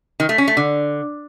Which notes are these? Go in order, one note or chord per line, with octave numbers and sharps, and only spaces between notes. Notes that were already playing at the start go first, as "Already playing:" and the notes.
D#3
A3
C#4
A3
D3